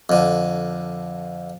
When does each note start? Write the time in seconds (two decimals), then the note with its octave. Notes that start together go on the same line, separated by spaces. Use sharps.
0.09 F2 D3